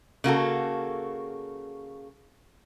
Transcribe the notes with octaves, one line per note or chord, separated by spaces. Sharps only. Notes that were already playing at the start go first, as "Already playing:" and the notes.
C#3 A#3 F#4 A4